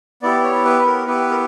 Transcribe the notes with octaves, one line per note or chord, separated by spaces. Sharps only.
B3 E4 G4 D5
C#5
B4
A#4
B3 E4 G4 B4
A#4